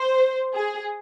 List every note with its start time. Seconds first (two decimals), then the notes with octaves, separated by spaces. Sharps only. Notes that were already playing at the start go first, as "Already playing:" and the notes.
Already playing: C5
0.54 G#4